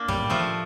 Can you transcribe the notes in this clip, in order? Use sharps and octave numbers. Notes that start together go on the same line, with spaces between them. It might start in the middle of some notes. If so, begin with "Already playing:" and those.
Already playing: A#3 D4
A2 G3
A2 F3 A3